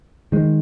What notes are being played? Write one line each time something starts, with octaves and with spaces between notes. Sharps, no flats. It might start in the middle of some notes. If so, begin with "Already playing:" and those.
D#3 G#3